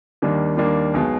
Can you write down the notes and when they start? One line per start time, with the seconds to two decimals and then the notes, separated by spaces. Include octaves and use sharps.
0.22 D#2 D#3 G3 A#3 D4
0.57 D#2 D#3 G3 A#3 D4
0.94 B1 B2 G#3